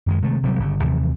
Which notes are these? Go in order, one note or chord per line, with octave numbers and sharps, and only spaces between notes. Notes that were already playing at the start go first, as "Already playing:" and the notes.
F#2 D#3 G#3
C3 D#3 G#3 A3
D1 C3 F#3 G3
G1 C#3
D#2 C3 E3 F3